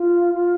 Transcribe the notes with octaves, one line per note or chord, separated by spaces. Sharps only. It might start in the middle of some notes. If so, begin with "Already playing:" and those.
Already playing: F4
F4